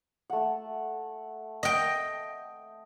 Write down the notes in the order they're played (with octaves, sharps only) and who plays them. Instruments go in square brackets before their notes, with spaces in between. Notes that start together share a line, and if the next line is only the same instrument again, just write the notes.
[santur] A3 F#5
[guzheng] D#5 G5